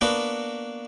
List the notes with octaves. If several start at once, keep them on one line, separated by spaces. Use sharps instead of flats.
A#3 B3 D4 F#4 B4